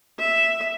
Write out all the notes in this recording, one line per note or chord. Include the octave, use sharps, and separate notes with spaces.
E5